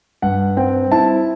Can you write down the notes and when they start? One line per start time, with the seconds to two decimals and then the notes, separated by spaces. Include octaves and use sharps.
0.22 G2 F#5
0.57 C4 G5
0.92 E4 A5